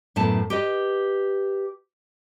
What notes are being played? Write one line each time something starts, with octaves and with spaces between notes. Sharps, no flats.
F#2 A2 A3 B3 A5
G4 B4 D#5